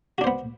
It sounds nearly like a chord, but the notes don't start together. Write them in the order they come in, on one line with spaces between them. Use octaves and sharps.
F#4 D4 C5 B3